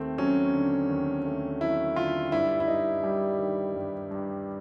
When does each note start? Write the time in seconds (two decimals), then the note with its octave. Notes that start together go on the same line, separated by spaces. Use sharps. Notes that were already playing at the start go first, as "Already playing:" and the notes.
Already playing: D#2 A3 C4
0.18 F#3 C#4
0.54 D3
0.90 D#2
1.25 A3
1.61 F#3 E4
1.96 D3 F4
2.32 G2 E4
2.60 E4
2.68 G2 D#4
3.03 G3
3.39 D#3
3.75 G2
4.11 G2